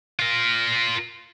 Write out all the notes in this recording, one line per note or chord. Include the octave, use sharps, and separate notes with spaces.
F4 A#4